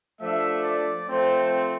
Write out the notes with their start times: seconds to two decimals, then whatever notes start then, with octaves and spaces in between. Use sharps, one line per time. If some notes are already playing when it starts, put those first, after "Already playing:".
0.21 F3 A3 D4 E5
0.64 D5
1.08 F3 A3 C4